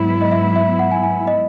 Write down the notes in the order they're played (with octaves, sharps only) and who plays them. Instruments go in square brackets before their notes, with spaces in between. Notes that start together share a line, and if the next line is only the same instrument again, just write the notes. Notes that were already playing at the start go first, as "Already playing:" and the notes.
Already playing: [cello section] G#2 F#3 B3 E4
[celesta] D#5
E5
E5
F#5
G#5
G#5
D#5